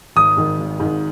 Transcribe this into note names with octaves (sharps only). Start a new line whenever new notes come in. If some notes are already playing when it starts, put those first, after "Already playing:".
G#1 D#6
G#2 D#3
G#1
G#2 D#3